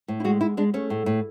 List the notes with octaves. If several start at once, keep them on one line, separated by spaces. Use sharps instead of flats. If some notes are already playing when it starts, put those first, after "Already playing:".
A2
E4
G#3 F#4
G#3 E4
G#3 D4
A3 C#4
A2
A2